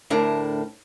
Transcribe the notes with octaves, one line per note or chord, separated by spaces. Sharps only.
D2 A2 D4 A#4 A5